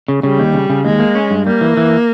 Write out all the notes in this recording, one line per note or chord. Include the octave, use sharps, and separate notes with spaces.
C#3
C#3 G3
D#2
C#3
C#3
D#2 G#3
A#3
C#4
G2
G3 A#3
E3
E3